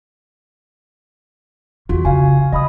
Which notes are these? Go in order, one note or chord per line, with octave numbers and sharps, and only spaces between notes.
E2 E3 F4 F#4
C#3 F5 G#5
C#4 D#5 B5 D#6